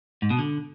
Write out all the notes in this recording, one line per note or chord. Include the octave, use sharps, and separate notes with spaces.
G#2
B2
D3